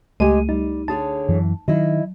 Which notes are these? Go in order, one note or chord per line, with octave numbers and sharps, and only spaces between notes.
C#2 G#3 A3 G4 G#5 D#7
G3 D#4
D3 G#4 C#5 A5
F#2 E3
D#3 F#3 E4 D#5